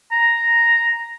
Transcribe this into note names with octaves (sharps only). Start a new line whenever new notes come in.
A#5